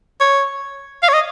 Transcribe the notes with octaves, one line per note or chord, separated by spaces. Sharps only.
C#5
F5
C#5
D#5